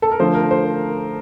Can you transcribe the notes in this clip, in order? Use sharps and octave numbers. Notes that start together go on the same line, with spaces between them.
A4
A#4
D3 F3 A3 C5
A#4
C5